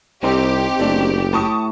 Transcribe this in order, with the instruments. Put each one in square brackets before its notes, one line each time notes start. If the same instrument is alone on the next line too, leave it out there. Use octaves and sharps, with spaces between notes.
[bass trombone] C2 [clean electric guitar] C4 D#4 C5 [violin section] G4
[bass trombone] F#1 [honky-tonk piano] A3 D4
[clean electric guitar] A2 [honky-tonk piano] A5 C#6 D#6